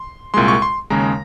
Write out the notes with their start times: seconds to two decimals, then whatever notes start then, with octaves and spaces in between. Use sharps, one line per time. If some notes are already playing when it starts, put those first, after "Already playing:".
Already playing: C6
0.34 C2 A#2 G#3 C6
0.48 C#6
0.62 C6
0.90 D#2 C#3 G#3 A#5